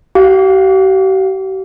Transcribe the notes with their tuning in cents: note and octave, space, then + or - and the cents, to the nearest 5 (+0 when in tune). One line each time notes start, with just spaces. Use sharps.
G4 -45 F5 +5